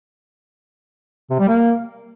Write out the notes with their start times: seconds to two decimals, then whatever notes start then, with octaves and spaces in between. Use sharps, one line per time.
1.30 C3
1.39 G3
1.48 A#3